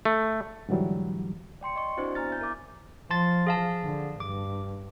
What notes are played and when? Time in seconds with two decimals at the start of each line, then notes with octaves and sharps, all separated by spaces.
0.05 A3
0.69 G#2 D3 E3 F#3 G3
1.61 D5 G5 C6 C#7
1.76 D#5 C6 C#6
1.97 C4 D4 E4 F#4 C5 D5
2.15 B3 E4 G#5 A#5 F6 A6
2.29 E5 G#5 G6
2.41 A#4 E5 D6
3.11 F3 A5 C6 A6
3.47 G#4 F5 A5
3.84 D3
4.20 G2 D6